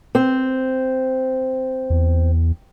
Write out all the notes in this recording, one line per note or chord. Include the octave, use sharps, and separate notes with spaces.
C4
E2